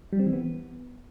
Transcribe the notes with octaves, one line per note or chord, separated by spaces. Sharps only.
G3
C4
E3
B3